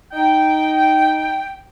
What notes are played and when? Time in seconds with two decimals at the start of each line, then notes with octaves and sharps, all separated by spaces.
0.13 D#4 G5